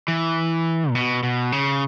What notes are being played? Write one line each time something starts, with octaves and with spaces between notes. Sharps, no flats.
E3
A#2
B2
B2
C#3